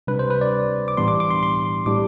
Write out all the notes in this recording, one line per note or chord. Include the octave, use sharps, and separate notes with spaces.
C3 G3 D4 B4
C5
B4
D5
D6
A2 E3 G3 B3 D4 C6
D6
D6
C6
C6
A2 G3 D4 D6